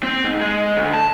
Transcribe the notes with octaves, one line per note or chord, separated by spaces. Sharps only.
C4
G#2
G#3
D2
A5